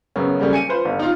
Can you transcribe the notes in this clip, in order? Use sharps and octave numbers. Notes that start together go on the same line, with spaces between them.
F#2 C#3 B3 C#4
C#3 F#3 G3 A3 A#3 C#4
G#5 C#7 D#7
F4 B4 C5
G1
D#4 F4